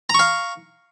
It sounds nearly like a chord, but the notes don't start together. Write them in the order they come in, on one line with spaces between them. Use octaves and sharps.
A#5 C#6 F5